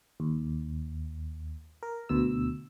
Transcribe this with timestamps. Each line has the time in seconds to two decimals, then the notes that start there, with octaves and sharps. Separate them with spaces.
0.20 D#2
1.83 A#4
2.09 D2 B2 E6